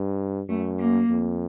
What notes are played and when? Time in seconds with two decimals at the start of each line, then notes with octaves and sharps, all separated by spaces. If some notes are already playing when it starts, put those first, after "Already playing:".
Already playing: G2
0.49 F#2 A3
0.79 A#3
1.09 F2